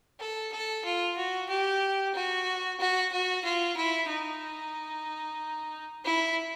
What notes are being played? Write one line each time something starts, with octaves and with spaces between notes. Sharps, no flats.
A4
A4
F4
F#4
G4
F#4
F#4
F#4
F4
E4
D#4
E4